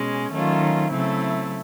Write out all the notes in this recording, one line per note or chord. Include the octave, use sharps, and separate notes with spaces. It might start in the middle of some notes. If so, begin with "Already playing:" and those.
Already playing: B2 G#3 C#4
D#3 F#3 A3 C#4 F4
C#3 F#3 A3 C4 E4